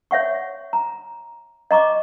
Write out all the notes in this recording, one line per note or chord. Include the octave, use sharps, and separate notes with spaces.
C#5 E5 F#5 C#6
A#5
D#5 A#5 C#6 D6